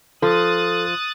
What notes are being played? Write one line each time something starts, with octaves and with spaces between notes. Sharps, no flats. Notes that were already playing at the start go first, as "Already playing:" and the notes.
F3 A4 D#6 F#6 A6